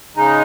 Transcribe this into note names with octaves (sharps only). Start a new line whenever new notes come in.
C#3 G#3 D#4